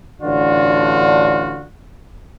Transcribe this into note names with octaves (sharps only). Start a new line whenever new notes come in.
A1 D3 D4 F4 F#4